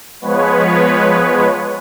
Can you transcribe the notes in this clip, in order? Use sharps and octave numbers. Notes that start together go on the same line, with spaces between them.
F3 G#3 B3 B4 C#5